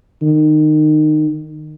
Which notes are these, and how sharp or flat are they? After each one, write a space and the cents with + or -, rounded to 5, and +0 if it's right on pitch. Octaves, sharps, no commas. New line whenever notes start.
D#3 -25